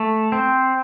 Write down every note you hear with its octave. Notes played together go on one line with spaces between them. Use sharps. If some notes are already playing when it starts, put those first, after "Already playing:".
Already playing: A3
C4